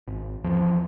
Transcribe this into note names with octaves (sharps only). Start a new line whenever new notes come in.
G#1
E2 F3